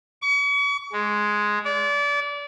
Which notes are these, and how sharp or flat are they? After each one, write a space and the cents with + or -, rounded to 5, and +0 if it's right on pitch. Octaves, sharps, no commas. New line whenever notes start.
C#6 +40
G#3 +5
D5 -30